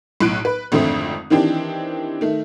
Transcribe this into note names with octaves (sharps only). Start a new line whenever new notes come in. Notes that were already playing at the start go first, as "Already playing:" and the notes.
B1 A2 F#6 D7
B4
G#1 F2 D3 A3 C4 D#6
D#3 E3 C4 D4 G4
D#3 A3